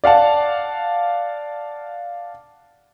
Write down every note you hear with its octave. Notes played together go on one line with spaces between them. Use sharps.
D5 F5 F#5 A5